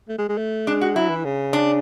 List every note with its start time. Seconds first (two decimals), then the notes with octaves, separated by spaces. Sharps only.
0.09 A3
0.18 G#3
0.29 G#3
0.37 A3
0.67 G#3 D4
0.81 F#4
0.96 F#3 E4
1.10 E3
1.25 C#3
1.53 D4